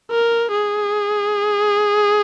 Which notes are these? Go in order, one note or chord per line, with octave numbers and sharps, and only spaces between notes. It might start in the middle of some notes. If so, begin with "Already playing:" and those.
A#4
G#4